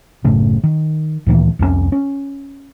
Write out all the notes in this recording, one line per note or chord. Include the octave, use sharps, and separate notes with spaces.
F#1 A2 C#3
D#3
D2 A#2 D#3 E3
C2 F2 G3 C#4
C#4